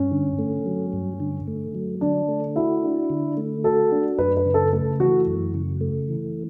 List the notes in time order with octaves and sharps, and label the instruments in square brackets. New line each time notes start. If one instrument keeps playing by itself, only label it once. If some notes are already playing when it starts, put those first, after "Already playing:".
Already playing: [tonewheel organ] G2 [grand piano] C#4
[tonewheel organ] D3
A3
F#3
G2
D3
A3
F#3
[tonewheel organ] D3 [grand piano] D4
[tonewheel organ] A3
[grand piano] E4 [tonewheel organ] F#4
[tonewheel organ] D4
D3
A3
[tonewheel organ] F#4 [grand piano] A4
[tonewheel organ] D4
[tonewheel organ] F#2 [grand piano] B4
[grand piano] B4
[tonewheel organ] C#3
[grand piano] A4
[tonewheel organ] A3 [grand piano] A4
[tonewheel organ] E3 [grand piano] F#4
[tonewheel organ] F#2
C#3
A3
E3